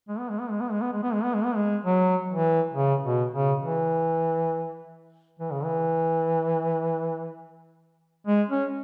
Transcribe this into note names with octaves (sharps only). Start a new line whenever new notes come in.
G#3
B3
G#3
B3
G#3
B3
G#3
B3
G#3
B3
G#3
B3
G#3
B3
G#3
F#3
E3
C#3
B2
C#3
E3
E3
C#3
E3
G#3
C#4